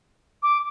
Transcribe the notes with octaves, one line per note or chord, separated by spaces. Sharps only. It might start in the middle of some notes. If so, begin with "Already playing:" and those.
D6